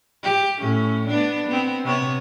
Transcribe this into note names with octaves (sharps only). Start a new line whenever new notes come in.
G4
A2 C#4
B3 D4
B3 C4
C3 B3 C#5